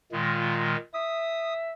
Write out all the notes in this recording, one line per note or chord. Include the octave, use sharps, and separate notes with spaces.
A#2 D#3 G#3 F4
E5 D#6